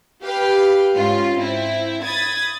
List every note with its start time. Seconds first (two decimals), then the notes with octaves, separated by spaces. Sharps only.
0.23 G4 B4 F5 G5
0.95 G#2 C#4 F4
1.38 C4 E4
2.04 B5 D#6 G#6 A6